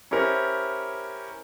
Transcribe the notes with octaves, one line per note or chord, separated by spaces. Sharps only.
C#4 E4 G4 A#4 C5